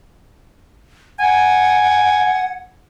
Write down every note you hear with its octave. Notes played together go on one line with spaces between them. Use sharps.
F#5 G#5